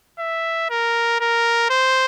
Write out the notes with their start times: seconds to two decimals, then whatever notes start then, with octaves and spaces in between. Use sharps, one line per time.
0.19 E5
0.70 A#4
1.20 A#4
1.70 C5